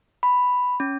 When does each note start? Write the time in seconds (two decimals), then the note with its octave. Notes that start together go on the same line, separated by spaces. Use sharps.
0.23 B5
0.80 C#4